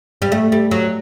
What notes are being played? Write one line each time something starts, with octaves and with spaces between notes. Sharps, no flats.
G3
A3
G3
F#3